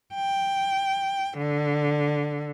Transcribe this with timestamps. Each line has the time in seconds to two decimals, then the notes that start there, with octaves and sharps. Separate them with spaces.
0.14 G5
1.38 D3